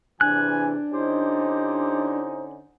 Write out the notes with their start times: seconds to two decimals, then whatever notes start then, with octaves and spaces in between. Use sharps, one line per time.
0.21 E2 C3 E3 D4 G#5 F#6
0.92 D3 C#4 D#4 E4 G4 C5